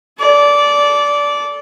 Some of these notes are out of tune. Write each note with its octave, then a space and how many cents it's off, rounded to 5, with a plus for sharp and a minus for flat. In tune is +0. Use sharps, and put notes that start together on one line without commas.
A4 -20 D5 -15